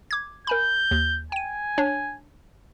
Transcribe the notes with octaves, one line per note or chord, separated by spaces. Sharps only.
D6 G#6
A#4 G#5 B5 G6
D#2
G5 G#5 D#7
D4 C#5